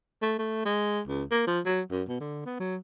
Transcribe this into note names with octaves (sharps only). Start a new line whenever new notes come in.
A3
A3
G#3
C#2
A#3
F3
F#3
F#2
B2
D3
B3
F#3